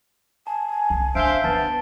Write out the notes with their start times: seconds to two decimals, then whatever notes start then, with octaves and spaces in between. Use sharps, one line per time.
0.47 G#5 A5
0.90 C2
1.15 D4 C5 E5 F5 D7 G7
1.44 B3 D4 F4 A5 A6